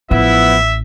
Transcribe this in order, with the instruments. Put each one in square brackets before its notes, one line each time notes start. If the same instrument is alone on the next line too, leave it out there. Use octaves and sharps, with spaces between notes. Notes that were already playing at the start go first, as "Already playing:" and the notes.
[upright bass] A1 [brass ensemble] F3 B3 E4 [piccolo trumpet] E5